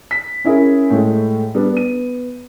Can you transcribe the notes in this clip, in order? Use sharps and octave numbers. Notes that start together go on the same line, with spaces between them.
B6
C#4 E4 G#4 A#4
A2 G#3 A3
G3 B3 D4
B3 D#7